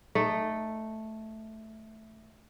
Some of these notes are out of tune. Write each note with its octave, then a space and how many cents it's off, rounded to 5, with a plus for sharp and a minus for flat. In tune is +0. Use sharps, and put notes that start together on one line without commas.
A3 +0 D#4 -15